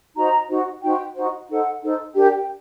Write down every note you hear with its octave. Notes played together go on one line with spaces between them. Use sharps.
D#4 F#4 C5 A#5
D#4 F#4 C5
D#4 F#4 C5 G5
D#4 F#4 C5
D#4 A4 C5 F#5
D#4 A4 C5
D4 G4 A#4 G5